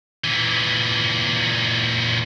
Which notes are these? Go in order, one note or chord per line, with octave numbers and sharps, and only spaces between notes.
A#2 E3